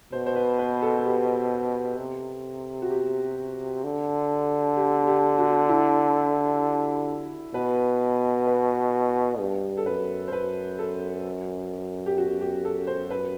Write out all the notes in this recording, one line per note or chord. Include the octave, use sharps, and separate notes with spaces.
B2 C5
C5
B4
B4
A4
A4
G4
C3
F#4
G4
D3
G4
G4
F#4
E4
B2 B4
B4
G2
A4
F#2 B4
C5
F#2 B4
A4
G4
F#4
G4
A4
C5
B4